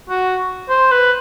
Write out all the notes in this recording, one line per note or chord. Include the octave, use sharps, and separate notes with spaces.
F#4
C5
B4